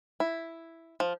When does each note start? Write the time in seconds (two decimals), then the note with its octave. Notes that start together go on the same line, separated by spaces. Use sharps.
0.20 E4
1.00 F3